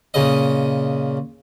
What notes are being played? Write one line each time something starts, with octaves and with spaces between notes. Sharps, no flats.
A#2 C#3 D#5